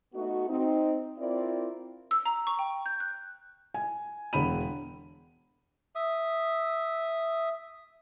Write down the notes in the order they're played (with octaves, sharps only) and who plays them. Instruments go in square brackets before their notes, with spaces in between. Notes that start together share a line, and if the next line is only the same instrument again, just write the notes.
[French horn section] A3 B3 D#4 F#4
C4 D#4
C4 E4 F4 A#4 D5
[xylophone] E6
A#5
C#6
G5
G6
F#6
[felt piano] G#5
E1 D3 B5 D#7
[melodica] E5 D#6